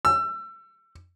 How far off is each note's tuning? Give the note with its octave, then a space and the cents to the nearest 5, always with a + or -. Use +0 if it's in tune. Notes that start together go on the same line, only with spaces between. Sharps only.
E6 +30